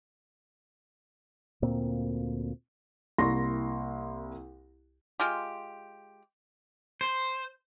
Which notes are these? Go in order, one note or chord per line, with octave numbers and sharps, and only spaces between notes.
D2 A#2 A#3 C4
C2 A#3 E4 C6 C#6 A#6
G#3 F4 G4
C5